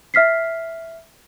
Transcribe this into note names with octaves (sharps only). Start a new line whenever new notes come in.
E5 F6 B6 C7